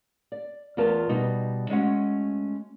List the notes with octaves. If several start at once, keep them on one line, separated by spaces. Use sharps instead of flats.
D5
E2 A3 F4 A#4 A5
B2 G3 D#4
G#3 A3 C#4 F#4 F#5